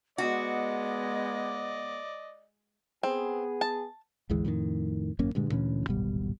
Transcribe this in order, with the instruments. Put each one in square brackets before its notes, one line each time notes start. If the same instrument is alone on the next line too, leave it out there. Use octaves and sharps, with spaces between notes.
[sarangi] G#3 [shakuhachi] B3 [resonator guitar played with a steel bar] F#4 [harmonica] D5 D#5
[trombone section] B3 G#4 [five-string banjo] C4
[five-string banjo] A5
[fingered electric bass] G#1 D2 E3 G#3
F2 A2 C3 D#3
G#1 F#2 A#3 C#4
G2 A#2 D3 G#3
D2 A#2 E3 C#4
D1 G#1 B2 G3